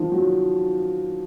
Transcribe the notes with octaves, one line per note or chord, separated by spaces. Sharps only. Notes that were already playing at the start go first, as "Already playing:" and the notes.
Already playing: D#3 F3
F#3